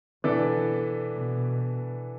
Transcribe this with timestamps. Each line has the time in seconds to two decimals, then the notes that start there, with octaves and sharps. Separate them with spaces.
0.24 B2 E3 B3 D4 A4 D5
0.70 B2
1.15 B2